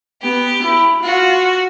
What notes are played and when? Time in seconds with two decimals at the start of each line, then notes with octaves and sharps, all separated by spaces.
0.22 B3 G4
0.63 E4
1.03 F4 F#4